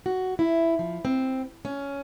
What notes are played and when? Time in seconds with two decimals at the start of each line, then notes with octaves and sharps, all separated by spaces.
0.06 F#4
0.39 E4
0.79 F3
1.05 C4
1.65 C#4